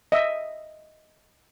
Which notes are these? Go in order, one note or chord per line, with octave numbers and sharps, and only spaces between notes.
D#5 E5